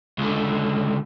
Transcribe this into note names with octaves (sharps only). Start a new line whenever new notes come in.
C#2 D3